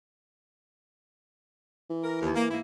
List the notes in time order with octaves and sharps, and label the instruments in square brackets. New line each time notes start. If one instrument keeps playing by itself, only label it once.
[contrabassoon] E3
[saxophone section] A#4
D#2
A#3
G#2 A#3 E4